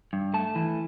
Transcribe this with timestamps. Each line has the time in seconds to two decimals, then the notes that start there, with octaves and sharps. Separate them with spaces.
0.13 G2
0.34 A3 A5
0.55 E3